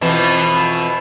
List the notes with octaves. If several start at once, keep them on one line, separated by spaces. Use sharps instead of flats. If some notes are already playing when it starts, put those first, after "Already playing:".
F2 B2 E3